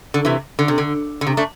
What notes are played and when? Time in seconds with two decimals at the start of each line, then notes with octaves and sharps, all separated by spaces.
0.14 D3
0.25 C3 E3
0.59 D3
0.68 C3
0.78 D3
1.21 D3
1.27 C3
1.37 A3 D4